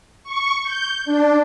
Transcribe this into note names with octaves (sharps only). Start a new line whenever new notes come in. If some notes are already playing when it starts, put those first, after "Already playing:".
C#6
G6
D4